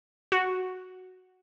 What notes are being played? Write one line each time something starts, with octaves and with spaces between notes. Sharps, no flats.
F#4